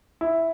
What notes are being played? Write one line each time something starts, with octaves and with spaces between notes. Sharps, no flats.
E4